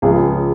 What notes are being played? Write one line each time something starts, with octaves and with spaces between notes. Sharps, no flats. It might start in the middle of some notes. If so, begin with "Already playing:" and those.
C#2 C#3 F3 G#4